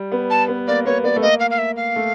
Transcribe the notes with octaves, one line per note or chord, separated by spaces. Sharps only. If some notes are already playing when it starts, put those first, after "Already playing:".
Already playing: G3
B3
A5
B3
A#3 D5
B3 C#5
B3 D5
A3
A#3 D#5
F5
F5
E5
F5
A3